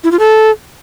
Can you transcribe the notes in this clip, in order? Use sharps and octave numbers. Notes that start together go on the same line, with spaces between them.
E4
F4
A4